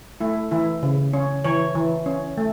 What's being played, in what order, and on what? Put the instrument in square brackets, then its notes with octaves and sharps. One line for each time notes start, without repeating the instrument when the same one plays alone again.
[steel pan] A3 E4
E3 E4
C#3
C#4
E3 C#5
E3
C#4
A3